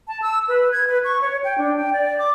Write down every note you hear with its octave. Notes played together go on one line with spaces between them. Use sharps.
A5
E6
B4
G#6
B4
C#6
C#5
G5
D4
G5
D5
D6